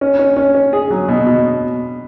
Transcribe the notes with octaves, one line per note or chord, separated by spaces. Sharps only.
C#4
C#4
C#4
C#4
G#4
F#3
B2
B2